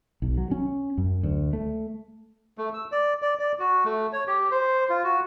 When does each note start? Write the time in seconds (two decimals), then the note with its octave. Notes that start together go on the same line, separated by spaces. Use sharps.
0.22 B1
0.38 F#3
0.51 C#4
0.98 F#2
1.23 D2
1.53 A3
2.58 A3
2.74 E6
2.92 D5
3.22 D5
3.39 D5
3.59 F#4
3.85 A3
4.13 C#5
4.27 G4
4.51 C5
4.90 F4
5.04 F#4